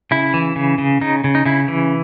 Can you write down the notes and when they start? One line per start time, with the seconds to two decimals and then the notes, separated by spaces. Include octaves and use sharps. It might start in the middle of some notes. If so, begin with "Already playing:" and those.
0.11 C#3 E4
0.34 E3
0.56 C#3
0.78 C#3
1.01 C#3 D#4
1.24 C#3
1.35 D#4
1.46 C#3 E4
1.68 E3